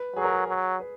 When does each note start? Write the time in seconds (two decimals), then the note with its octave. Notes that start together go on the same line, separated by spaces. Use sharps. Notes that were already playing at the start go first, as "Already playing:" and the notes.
Already playing: B4
0.16 F#3 G#4
0.24 A#4
0.33 G#4
0.48 F#3
0.80 B4